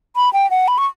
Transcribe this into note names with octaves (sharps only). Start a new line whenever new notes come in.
B5
G5
F#5
B5
C#6